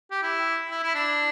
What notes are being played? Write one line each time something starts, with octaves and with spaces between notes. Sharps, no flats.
G4
E4
E4
E4
D4